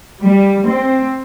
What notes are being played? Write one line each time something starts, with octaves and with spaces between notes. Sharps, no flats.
G3
C4